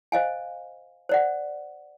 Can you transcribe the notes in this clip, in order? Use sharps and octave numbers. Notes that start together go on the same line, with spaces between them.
C5 D#5 F5 G#5
C5 D5 F#5